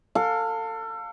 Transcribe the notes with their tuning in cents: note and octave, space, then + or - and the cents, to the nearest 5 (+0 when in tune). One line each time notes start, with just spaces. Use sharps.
A4 +30 F5 +15